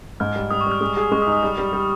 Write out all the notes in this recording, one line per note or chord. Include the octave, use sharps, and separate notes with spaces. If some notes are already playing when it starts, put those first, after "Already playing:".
G#2 F6
G3
G3 D#6
C#6
G3
F6
G#3 D#6
G#4
D#6
G#3 C#6
D#6
D#4
D#6
G3
G3
G3